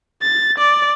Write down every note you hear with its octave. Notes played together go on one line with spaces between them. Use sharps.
A6
D5